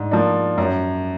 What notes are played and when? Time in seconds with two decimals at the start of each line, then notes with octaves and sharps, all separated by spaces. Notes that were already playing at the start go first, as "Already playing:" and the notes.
Already playing: G#2 D4
0.11 F3 A#3 D4
0.58 F#2